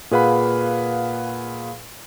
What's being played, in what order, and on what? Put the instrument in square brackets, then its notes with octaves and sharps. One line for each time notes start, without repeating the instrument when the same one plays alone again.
[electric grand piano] A#2 G#4 B4 F5 F#5 B5